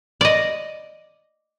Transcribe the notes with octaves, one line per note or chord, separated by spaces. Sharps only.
D5 D#5